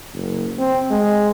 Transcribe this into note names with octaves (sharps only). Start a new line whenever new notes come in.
F#1
C4
G#3